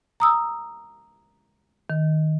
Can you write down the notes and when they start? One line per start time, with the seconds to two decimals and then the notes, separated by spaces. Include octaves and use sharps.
0.20 A#5 D#6 E6
1.90 D#3